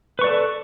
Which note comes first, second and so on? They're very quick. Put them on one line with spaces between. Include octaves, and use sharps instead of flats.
B4 C#6 D5 A4